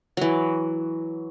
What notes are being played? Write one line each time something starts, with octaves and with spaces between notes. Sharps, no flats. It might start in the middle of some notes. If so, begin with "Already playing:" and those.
E3 F#3